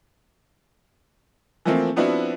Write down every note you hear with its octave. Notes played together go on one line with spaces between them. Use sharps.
E3 F3 A3 A#3 C4
F3 B3 C4 D4 E4 F#4